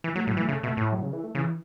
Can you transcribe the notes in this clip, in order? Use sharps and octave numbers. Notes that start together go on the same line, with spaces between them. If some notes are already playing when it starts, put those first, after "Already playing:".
E3
F#3 A3
A2 F#3
E3
A3
C#3
B2
A2
F#3
C#3
E3
A3
C#3 E3